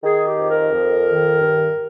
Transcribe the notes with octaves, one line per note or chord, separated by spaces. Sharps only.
D#3 G#4
G4
F2
A#4
F2
D#3
G2